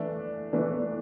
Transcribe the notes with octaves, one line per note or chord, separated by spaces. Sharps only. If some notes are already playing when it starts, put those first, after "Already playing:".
Already playing: E3 A3 D4
E3 A3 D4